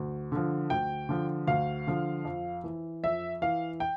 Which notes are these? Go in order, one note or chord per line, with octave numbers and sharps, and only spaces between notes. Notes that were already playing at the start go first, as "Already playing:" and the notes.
Already playing: D2
D3 F3
D2 G5
D3 F3
D2 F5
D3 F3
F2
E3
F2 E5
E3 F5
G5